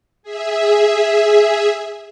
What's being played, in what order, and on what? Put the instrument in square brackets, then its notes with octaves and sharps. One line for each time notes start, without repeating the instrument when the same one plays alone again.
[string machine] G#4 E5